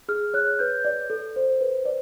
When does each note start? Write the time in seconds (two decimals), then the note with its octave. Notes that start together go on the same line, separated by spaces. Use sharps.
0.08 G#4 F6
0.34 C#5 F#6
0.59 B4 G6
0.85 D5
1.10 A4
1.36 C5
1.61 B4
1.85 D5